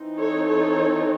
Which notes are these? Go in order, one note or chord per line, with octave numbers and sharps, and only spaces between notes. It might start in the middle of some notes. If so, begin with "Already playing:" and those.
Already playing: E3 C4 D#4
A4 C#5
A4 C#5